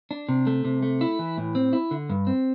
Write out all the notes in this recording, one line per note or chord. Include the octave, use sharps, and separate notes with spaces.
D4
C3
A3
C3
A3
E4
E3
A2
C4
E4
D3
G2
C4